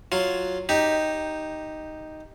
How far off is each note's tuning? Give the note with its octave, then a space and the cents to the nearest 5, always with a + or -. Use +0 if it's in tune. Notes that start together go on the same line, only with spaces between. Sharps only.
F#3 +0 F4 +0
D#4 +0 G4 +0